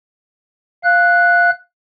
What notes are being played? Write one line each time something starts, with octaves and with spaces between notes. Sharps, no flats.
F5 F#6